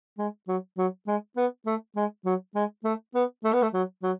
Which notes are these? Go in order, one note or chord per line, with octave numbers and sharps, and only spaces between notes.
G#3
F#3
F#3
G#3
B3
A3
G#3
F#3
G#3
A3
B3
A3
B3
A3
F#3
F#3